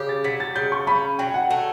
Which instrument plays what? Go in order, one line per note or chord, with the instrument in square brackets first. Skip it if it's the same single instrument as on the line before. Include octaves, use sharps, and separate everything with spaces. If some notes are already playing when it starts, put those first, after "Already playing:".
Already playing: [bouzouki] C#3 G4
[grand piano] A6
[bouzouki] F#3 [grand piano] B6
[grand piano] A6
[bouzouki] C#3 [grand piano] G6
[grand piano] C#6
[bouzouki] C#4 [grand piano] B5
[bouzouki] F#3 [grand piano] G5
[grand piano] F#5
[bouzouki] A3